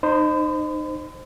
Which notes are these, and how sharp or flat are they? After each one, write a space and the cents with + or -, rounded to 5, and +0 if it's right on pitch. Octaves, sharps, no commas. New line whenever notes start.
D#4 -25 C5 +0 B5 +45